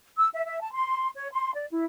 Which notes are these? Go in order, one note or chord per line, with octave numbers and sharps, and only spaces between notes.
E6
E5
E5
A5
C6
C#5
C6
D5
E4